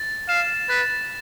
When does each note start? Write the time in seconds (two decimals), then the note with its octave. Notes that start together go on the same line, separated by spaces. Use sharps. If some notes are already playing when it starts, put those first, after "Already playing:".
Already playing: A6
0.29 F5 E7
0.69 B4 A6